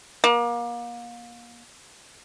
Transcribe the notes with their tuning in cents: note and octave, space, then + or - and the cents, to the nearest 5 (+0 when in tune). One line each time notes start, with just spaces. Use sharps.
A#3 +30